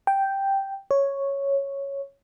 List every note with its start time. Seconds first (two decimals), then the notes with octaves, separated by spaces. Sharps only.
0.07 G5
0.91 C#5